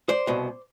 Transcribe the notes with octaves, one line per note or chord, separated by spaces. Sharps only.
C5 D5
C2 B2